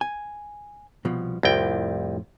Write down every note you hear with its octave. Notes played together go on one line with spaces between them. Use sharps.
G#5
C2 B2 F3
C2 F2 A2 F4 G5